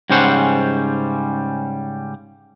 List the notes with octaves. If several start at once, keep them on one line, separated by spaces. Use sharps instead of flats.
G#2 C#3 G3 C#4 C5 F#5